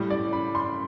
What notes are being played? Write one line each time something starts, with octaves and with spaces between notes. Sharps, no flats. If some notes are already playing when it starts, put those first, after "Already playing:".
Already playing: A2 G3
D5
B5
C6